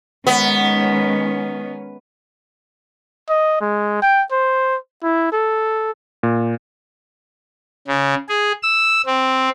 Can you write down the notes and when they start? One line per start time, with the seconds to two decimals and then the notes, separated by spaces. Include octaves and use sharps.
0.27 D#3 G#3 B3 C#4
3.29 D#5
3.61 G#3
4.02 G5
4.31 C5
5.03 E4
5.32 A4
6.23 A#2
7.88 C#3
8.29 G#4
8.63 E6
9.06 C4